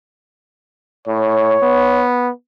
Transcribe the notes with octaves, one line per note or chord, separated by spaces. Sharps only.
A2 C#5
B3